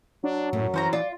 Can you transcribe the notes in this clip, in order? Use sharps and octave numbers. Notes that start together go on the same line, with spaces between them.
F#3 D4
F#2 A2
E3 C#4 C5 A#5
F4 D5